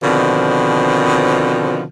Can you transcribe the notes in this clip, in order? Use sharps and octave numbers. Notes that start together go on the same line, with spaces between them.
B2 D3 D#3 F3 C4